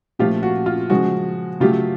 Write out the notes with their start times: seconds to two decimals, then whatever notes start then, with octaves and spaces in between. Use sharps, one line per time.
0.19 A#2 F3 A3 F4 G4
0.43 F#4
0.66 F4
0.90 C#3 F3 G#3 F#4
1.60 C#3 F#3 A3 F4 G4